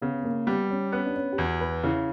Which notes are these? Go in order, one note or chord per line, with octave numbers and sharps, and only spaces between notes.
C#3 B3
B3
A#3
G3 B3
C#4
B3 C#4
D4
C#4
G4
E2 F#4
B4
C#3 E4